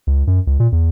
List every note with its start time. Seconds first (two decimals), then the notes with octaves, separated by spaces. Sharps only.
0.07 C#2
0.27 F#2
0.47 C#2
0.60 A#2
0.72 E2